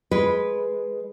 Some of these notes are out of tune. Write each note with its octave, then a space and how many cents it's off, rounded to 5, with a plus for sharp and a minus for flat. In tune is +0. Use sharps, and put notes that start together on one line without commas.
G#3 +0 B4 -5